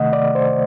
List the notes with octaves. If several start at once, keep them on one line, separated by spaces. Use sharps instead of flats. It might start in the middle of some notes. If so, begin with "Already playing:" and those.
Already playing: C3 D#3 A3 D#5 F#5
D5
C5